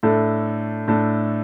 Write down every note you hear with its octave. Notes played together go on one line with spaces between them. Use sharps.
A2 A3 D4 A4
A2 A3 D4 A4